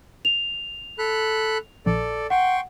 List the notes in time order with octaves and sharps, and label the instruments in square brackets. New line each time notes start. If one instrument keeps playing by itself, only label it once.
[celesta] F7
[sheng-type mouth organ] A4 B5 F#6
[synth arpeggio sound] A#1 [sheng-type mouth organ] A4 D5
[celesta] F#5 [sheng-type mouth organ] G5 C6 C#6